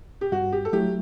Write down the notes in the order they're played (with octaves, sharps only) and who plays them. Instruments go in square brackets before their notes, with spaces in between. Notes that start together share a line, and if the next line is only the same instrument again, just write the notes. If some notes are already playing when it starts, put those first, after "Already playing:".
[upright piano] G4
[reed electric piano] G2 [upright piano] F#4
[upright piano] G4
A4
[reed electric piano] F#3 A3 E4 [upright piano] G4